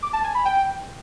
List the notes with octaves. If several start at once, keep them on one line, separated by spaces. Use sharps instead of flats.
D6
A5
G#5
B5
G5